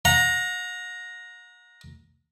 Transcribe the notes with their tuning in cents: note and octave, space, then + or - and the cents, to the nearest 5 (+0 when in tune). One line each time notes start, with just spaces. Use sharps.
F#5 -35 A#5 +5